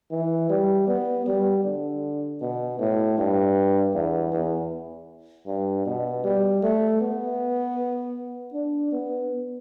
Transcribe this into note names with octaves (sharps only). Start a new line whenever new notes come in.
E3
G3
B3
G3
D3
B2
A2
G2
E2
E2
G2
B2
G3
A3
B3
D4
B3